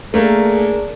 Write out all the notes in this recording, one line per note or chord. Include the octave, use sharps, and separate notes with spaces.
A3 A#3 D4 G#4 A#4